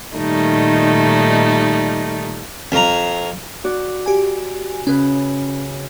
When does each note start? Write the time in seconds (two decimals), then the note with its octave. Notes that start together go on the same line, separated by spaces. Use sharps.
0.16 A#2 D#3 G3 A3 D#4
2.72 F2 A#5
3.64 F#4 D5
4.06 G4 G#5
4.87 C#3 C#4 B4